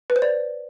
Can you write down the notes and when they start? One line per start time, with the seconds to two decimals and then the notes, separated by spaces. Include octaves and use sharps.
0.10 B4
0.16 C5
0.22 D5